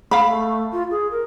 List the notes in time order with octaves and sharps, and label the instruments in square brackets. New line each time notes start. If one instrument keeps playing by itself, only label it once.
[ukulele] F5 B5
[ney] A3
F4
G#4
A#4